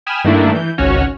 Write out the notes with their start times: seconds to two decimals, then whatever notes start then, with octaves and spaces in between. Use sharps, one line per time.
0.06 G5 G#5 B5 D#6 F6 E7
0.24 G2 D#3 A3 A#3 D4 E4
0.51 E3 G6
0.78 G#1 C#2 C#4 F#4 C#5 F6